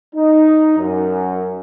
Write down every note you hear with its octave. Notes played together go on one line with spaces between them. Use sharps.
D#4
F#2